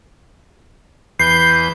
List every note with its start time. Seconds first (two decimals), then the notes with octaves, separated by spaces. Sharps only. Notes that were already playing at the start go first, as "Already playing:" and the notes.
1.19 E2 B4 G6 C7